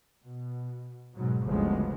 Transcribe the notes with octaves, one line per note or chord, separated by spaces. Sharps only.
B2
G#2 B2 F#3
G1 D2 C#3 F3 G#3 B3